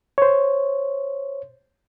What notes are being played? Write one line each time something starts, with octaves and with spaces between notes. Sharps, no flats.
C5 C#5